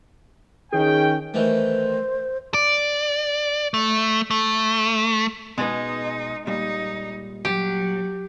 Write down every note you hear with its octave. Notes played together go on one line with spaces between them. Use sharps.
D#3 C#4 G#4 G5
D#3 E3 A3 C5
D5
A3
A3
B2 G#3 D#4 B4
A#2 G3 D#4
F#3 G4